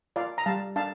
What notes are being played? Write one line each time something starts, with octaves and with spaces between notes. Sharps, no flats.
F4 D5 F5
A#5
G3 F5 A5
D4 F5 A5